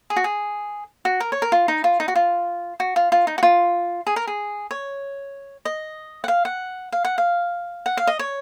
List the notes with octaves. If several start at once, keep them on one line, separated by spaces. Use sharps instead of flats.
G#4
F#4
G#4
F#4
A#4
C#5
A#4
F4
D#4
F4
D#4
F#4
F4
F#4
F4
F4
D#4
F#4
F4
G#4
A#4
G#4
C#5
D#5
F#5
F5
F#5
F5
F#5
F5
F#5
F5
D#5
C#5